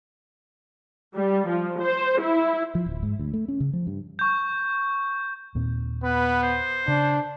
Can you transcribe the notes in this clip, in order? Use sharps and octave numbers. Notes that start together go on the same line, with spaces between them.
G3
F3
C5
E4
F3
D1
G#2
D2
A3
C#4
C#3
F3
G2
C#6 G6
D#2 A#2 C4
B3 B4
C5
C#3 D4